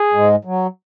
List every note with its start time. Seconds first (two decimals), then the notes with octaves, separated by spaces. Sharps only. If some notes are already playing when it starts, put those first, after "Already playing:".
Already playing: G#4
0.13 G#2 G#3
0.45 F#3